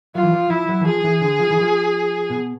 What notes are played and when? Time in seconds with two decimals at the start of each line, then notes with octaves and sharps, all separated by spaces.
0.15 F#3 F4
0.23 E3
0.33 F3
0.50 F3 E4
0.69 F#3
0.81 E3
0.87 F3 G#4
1.04 E3
1.21 D3
1.39 F3
1.51 E3
1.61 F3
2.30 B2